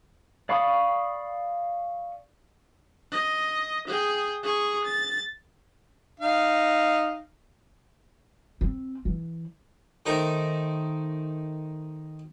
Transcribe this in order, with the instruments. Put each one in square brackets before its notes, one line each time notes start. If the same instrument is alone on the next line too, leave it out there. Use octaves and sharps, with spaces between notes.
[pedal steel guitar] D5 F5 B5 C#6 D#6
[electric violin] D#5
G#4 G5
G#4 C#6
A6
[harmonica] D#4 F5
[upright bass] C4
E3
[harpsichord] D#3 A3 D#4 C5 A#5 C#6